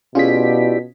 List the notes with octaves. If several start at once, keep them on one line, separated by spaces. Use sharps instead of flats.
B2 C#4 E4 F4 G4 G#4 D5 B6